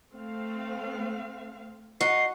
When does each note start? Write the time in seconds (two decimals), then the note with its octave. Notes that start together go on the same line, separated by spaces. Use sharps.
0.13 A3 C4 F5
2.01 D#4 F#4 C7